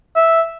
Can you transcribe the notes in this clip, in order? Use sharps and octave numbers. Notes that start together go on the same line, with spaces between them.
E5